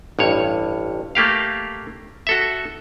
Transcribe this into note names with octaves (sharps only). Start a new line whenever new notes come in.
A1 G2 C#5
A3 A#3 G4 F5
F#4 A4 E5